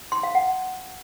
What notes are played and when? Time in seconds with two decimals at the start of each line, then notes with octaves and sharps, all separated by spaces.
0.12 C6
0.23 F5
0.35 F#5